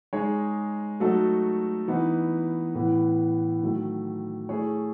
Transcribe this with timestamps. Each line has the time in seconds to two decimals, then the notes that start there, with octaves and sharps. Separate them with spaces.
0.13 G#3 D#4 G#4 C#5
1.00 F#3 A3 D#4 F#4 A4
1.88 E3 B3 D#4
2.75 A2 E3 B3
3.62 D#3 F#3 A3
4.49 A3 E4 G#4 C#5